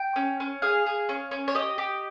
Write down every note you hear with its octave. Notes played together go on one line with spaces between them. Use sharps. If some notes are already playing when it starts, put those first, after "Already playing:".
Already playing: G5
C#4
C#4
G#4 F5
G#4
C#4
C#4
C#5
G4 D#5
G4